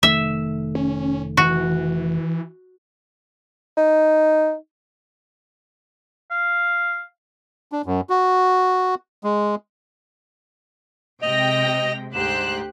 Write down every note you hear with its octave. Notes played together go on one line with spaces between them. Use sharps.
F1 D#3 A3 E5
C#4
E3 F#4
D#4
F5
D4
F#2
F#4
G#3
C3 G#3 D#5 G5 A#6 F7
D2 G#2 G4 C5 F#6 E7